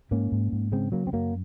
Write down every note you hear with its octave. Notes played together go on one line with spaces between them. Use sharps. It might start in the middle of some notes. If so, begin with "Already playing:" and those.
G#2 A#3 C#4
G#2
G#2
C#3 G#3 C4
C#3 F#3 A#3
C4
F#2 F#3 A#3